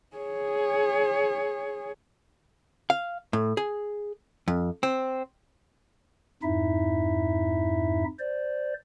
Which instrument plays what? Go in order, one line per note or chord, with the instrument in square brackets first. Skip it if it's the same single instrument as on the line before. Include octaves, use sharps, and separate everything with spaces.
[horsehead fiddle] G#4 C#5
[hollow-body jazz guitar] F5
A2
G#4
F2
C4
[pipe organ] F2 G#2 D#4 E4 E5
C5 D5